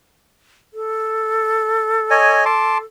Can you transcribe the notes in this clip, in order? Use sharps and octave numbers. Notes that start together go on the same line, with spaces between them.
A4
C#5 D#5 G#5
A5 C6 D6